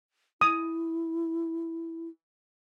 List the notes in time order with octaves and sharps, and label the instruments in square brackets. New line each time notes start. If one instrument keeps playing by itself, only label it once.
[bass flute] E4 [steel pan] D#6